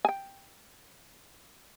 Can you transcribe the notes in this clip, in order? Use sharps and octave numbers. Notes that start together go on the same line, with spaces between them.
G5 G#5